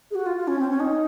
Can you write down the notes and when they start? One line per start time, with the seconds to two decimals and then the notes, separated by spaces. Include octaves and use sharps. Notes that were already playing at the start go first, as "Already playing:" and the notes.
0.10 G#4
0.15 F#4
0.26 F4
0.36 F4
0.47 C#4
0.58 C4
0.69 C#4
0.79 D#4